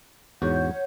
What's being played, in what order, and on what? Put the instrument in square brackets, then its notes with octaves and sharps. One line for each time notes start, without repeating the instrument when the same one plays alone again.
[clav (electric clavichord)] E2 G#2 F#4 [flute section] C#5 F#5 G6